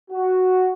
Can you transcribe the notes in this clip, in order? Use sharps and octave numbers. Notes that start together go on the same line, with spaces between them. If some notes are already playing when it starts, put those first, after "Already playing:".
F#4